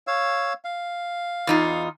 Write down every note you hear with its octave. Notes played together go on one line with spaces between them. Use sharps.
C#5 F5 E6
F5
E2 D#4 F4